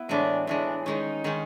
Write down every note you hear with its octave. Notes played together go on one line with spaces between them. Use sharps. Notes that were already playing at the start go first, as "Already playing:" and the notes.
Already playing: B3 E4
A2 E3 G#3 D4
A2 E3 G#3 D4
D#3 G#3 C#4 D#4
D#3 G#3 C#4